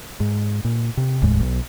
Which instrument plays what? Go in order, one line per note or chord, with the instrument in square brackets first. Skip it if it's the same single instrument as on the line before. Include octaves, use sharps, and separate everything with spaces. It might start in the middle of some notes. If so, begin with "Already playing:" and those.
[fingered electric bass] G#2
A#2
C3
F1 D#2 A2 G#3
B1